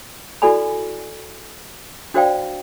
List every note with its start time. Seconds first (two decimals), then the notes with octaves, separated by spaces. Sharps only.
0.42 E4 F#4 A4 D5 G#5 B5
2.14 D4 F#4 C5 D5 F5 G5